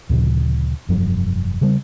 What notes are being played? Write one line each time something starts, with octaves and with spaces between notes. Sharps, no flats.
D2 A#2 C#3 F3
F1 G2 F3 F#3
C#3 G3 C4